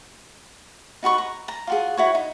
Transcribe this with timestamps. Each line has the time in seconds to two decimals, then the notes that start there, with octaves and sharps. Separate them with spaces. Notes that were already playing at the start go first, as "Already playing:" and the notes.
1.03 D#4 F#4 B4 C#6
1.18 A#5
1.48 A#5
1.67 F4 F#4 G#4
1.97 E4 F#4 C#5
2.15 D#4